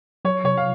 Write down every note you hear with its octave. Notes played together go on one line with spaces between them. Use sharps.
F#3 C#5
C3 C#5
F5